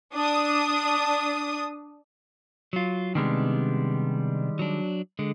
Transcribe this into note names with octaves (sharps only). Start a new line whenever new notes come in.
D4 D#6
F#3 F4
C3 D#3 G3 G#3 B3 D4
F#3 D4
D3 G#3